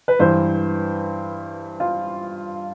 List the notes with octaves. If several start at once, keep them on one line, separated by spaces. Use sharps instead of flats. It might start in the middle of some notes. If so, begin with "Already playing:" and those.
B4
G2 E3 C5
F4